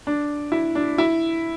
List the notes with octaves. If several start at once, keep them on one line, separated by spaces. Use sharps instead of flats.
D4
E4
D4
E4